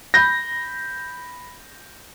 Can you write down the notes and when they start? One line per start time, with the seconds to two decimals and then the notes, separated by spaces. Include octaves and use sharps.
0.14 B5 G6 A#6